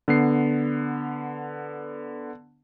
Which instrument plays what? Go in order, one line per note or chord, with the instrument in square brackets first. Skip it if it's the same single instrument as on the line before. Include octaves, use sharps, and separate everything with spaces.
[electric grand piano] D3 B3 C7